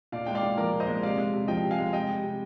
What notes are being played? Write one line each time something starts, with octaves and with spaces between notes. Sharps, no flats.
A#2 D5 F5
G#3 G5
D5 F5
A#2
F3 A#4 D5
A#2
C5 D#5
G#3
C3 D5 F5
G#3
C3
F3 D#5 G5
C3
F5 G#5
G#3
C3 D#5 G5
G3
C3